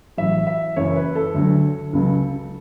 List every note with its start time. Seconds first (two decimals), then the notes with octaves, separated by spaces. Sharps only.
0.18 A1 A2 F#3 E5
0.47 E5
0.76 F#1 F#2 E3 C#5
0.96 B4
1.15 A4
1.34 D2 D3 F#3
1.93 C#2 C#3 F#3